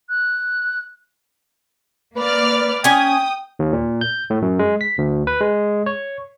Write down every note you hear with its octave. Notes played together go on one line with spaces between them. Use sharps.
F#6
A#3 B4 D5 F6
C#4 G5 G#5 D#6
D#2
A#2
G6
A2
F#2
G#3
B6
D2
B4
G#3
C#5